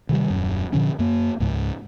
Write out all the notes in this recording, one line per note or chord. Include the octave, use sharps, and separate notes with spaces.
C3 D#3 F3 G3
D#1 F#2
A#2 D3 F3 C#4
F#2 A#3
C#2 G#2